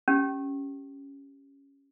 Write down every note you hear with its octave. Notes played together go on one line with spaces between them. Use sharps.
C#4 G4